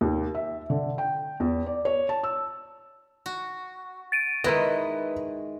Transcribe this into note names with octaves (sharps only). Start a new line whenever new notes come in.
D#2
E5
D3
G5
E2
D5
C#5
A5
E6
F#4
A6 D7 D#7
D#3 G#3 E4 B4 D#5